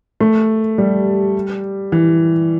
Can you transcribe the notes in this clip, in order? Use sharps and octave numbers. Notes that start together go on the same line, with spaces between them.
A3
G3
E3